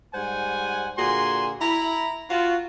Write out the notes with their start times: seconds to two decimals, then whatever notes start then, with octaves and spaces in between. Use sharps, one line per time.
0.14 G#2 G3 C5 F#5 G#5
0.98 A#2 D3 F#4 G#4 G#5 C6
1.61 E4 A#5 B5
2.30 F4 F#4